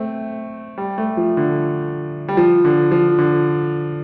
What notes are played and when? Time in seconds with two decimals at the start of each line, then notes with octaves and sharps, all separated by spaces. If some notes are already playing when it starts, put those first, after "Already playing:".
Already playing: A3 C4
0.78 G3
0.98 A3
1.17 F3
1.37 D3
2.28 G3
2.37 F3
2.65 D3
2.91 F3
3.19 D3